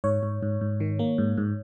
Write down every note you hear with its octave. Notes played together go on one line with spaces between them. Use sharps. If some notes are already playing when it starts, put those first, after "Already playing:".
G#2 C#5
G#2
G#2
G#2
D#3
A#3
G#2
G#2